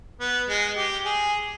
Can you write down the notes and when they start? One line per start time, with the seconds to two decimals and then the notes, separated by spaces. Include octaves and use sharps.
0.21 B3
0.49 G#3
0.77 G4
1.05 G#4